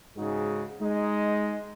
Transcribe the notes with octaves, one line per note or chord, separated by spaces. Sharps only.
G#2 C#3 D#4 F#4 G#4
G#3 D#4 D#5